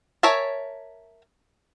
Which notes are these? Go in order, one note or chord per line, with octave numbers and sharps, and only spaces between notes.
A#4 C#5 E5 G#5 A5